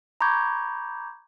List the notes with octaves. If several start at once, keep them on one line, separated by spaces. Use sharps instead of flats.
A#5 B5 C#6 D6 G6 G#6